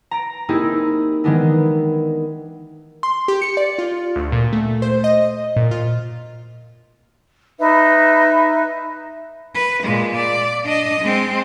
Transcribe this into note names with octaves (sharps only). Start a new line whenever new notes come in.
A#5 A#6 D7
A#3 C4 D#4 E4 G4 G#4
D#3 E3 G#3 B3 D4 D#4
C6
G4
C#7
D5
F4
D2
A#2
A3
C5
D#5
A#2
F4
D#4 B4 E5
B4
A#2 G#3
D5
D4 D#5
G#3 C4